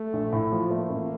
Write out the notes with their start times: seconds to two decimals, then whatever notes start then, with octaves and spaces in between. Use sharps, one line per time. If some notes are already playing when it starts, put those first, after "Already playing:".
Already playing: A3
0.13 A#1
0.33 A2
0.52 F3
0.70 A3 A#3
0.90 A1